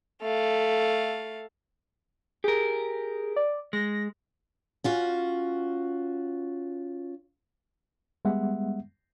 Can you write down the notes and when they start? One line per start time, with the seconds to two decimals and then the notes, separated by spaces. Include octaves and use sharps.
0.22 A3 F5
2.44 G4 G#4 A#4
3.36 D5
3.73 G#3 A#6
4.84 C#4 F4 F#4
8.25 G3 G#3 B3 E5 F#5